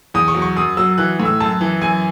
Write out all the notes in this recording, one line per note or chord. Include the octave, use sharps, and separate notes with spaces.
E2 D#6
C#6
F#3
C#6
F#2 D#6
F#3 E6
E3 F#6
A2
E6
F#2 A5
E3
F#2 G#5